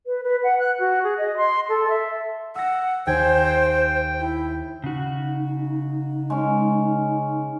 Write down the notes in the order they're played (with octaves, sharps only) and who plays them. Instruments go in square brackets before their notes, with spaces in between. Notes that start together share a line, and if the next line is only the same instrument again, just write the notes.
[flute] B4
B4
F#5
F#6
F#4
G#4
D#5
C6
A4
E5
[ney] F#5 [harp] E6 A#6
[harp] D#2 G#5 G#6 [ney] C5 [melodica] G5
[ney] E4
[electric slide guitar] C#3 F#4 [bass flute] D#4
[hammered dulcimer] G#3 C#4